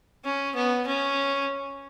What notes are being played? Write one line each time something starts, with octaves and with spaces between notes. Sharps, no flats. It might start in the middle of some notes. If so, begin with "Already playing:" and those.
C#4
B3
C#4